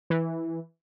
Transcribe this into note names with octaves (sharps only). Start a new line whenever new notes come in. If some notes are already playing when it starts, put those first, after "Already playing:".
E3